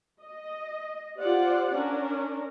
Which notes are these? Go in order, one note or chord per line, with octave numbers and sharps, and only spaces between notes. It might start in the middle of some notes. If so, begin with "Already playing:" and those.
D#5
F4 G4 C5 D5 F#5
C#4 D4 A#4